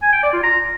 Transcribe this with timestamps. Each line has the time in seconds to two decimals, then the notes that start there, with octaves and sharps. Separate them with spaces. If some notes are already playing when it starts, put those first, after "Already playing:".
0.02 G#5
0.13 G5
0.23 D5
0.33 F4
0.43 A#5